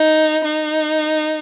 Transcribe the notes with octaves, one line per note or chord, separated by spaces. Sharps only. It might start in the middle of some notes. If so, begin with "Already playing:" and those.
Already playing: D#4
D#4